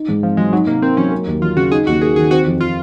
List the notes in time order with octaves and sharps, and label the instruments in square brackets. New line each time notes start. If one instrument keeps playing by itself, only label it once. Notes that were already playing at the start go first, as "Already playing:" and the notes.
Already playing: [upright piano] D#4
G#2
[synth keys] F3 [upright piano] C4
[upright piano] F#3 [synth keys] G#3
[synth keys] F#3 [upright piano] D#4
[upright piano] C3 [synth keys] A#3
[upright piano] A#3 [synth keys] C4
[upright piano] F#3 [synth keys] C#4
[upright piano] A#3
D#2
[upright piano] F#3 [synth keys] F4
[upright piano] C#3 [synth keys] F#4
[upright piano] D#4 [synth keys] G#4
[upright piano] D#2 [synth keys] F#4
[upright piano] A#3 [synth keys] G#4
[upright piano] D#3 [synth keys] G#4
[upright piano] C4 [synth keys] F#4
[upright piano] F2
[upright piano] F3 [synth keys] F4